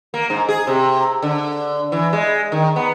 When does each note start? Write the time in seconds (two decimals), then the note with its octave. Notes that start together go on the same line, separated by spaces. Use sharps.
0.14 A#3
0.30 G#2
0.49 G#4
0.67 C3
1.22 D3
1.92 E3
2.13 G#3
2.52 D#3
2.76 B3